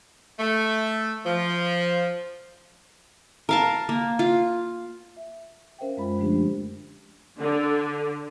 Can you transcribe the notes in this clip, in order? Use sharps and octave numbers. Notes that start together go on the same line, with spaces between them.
A3
F3
A#4 F5 A5
A#3
F4
E5
C#4 A#4 C5 E5 F5 G5
F#2 G#3 F4 B5
D3 F3 G#3 A3 D4 G4
D3